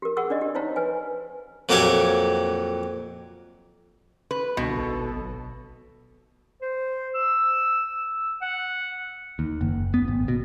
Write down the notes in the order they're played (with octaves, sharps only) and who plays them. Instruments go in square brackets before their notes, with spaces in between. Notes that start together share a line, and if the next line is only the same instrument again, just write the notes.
[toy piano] G4 A#4
G#4 A#4 F#5 C#6 E6
D4 D5 D#5
G4
D#4 C5 C#5 F5 A#5
B4 G#5
[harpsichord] F2 A#2 F#3 G4 A4 G#5
[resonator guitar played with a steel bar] B4
[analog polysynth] C2 D3 [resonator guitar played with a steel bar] B2
[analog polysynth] G#1 A4
B1
[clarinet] C5
E6
F#5
[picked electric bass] D#2
F#1
B3
G#1
B2